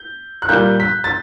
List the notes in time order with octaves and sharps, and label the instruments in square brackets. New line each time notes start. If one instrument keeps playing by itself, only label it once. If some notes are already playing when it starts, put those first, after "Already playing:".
Already playing: [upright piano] G6
F#6
A#2 G3 A#3 G6
B6
A6